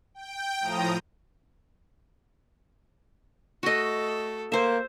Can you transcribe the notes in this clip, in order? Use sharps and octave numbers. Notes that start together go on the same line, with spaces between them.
G5
A2 F3 A#5 D#6
A3 F#4 A4 D#5
A#3 C5 E5